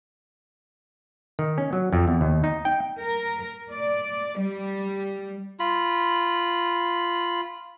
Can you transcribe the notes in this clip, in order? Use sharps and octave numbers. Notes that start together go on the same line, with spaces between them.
D#3
C#4
F#3
F2
E2
D#2
D#4
G5
A#4
D5
G3
F4 B5